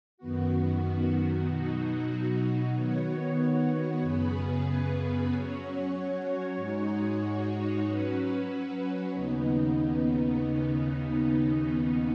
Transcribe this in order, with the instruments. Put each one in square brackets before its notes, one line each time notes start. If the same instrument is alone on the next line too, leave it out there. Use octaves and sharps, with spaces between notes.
[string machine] F#2 D#3 B3 F#4
B2 F#3 D#4 F#4
D#3 B3 F#4 C#5
F#2 C#3 B3 G#4 B4
F#3 C#4 F#4 C#5
G#2 G#3 D#4 F#4 C#5
F#3 C#4 F#4 B4
D#2 C#3 B3 D#4